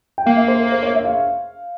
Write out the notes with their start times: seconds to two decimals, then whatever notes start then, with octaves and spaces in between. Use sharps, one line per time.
0.18 G5
0.26 A#3 F5
0.37 E5
0.48 C5
0.60 A#4
0.72 C5
0.83 C#5
0.95 E5
1.05 F5